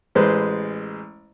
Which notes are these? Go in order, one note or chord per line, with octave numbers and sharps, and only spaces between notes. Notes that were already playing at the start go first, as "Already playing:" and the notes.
A1 G#3 B4 C5